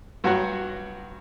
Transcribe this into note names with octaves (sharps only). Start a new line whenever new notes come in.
G2 F#3 F#4